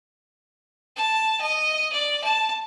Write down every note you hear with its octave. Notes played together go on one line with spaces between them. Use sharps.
A5
D#5
D5
A5